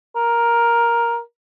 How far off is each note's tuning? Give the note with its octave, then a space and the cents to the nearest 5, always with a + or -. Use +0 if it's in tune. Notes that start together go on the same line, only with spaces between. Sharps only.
A#4 +10